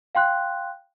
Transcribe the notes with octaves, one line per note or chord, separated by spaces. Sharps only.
F5 G5 C6 F#6